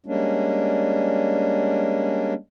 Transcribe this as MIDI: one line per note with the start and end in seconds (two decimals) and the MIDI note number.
0.06 2.34 55
0.06 2.34 56
0.06 2.34 58
0.06 2.34 61
0.06 2.34 62